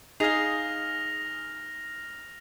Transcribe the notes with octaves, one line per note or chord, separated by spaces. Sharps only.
D#4 G#4 D#5 F5 F6 A#6 F7